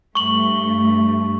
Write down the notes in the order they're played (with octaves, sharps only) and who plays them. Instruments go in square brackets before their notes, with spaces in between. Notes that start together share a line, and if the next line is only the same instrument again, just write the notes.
[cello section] G2 A3 [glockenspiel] C#6 F#7